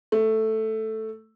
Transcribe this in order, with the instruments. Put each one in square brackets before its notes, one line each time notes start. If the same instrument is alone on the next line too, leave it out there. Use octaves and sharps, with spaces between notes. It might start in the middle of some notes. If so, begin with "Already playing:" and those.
[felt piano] A3